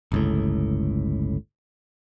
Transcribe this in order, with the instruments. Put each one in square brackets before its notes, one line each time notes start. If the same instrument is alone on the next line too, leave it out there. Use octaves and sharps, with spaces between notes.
[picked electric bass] G1 C#2 A2